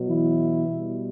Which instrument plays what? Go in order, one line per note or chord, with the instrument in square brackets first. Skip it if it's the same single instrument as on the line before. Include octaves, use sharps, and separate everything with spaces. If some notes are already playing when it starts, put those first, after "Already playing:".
Already playing: [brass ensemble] B2 F#3
E3 E4
B2 G3